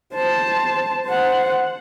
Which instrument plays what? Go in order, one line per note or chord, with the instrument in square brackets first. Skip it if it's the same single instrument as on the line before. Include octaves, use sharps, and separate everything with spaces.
[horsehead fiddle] C5 A5
C5 F#5